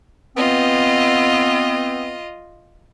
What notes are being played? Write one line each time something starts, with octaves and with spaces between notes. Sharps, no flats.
B3 C4 F4 D#5